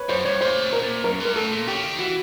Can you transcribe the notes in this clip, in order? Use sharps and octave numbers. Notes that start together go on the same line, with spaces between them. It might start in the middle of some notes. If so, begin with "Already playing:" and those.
Already playing: B4 C#5
F#2 C5
G2 C#5
A#2 C5
B2
A#4
A#2
F#2 A#4
G2
A#4
A2 A4
A#2
C#3 G4
D#3
E3 F#4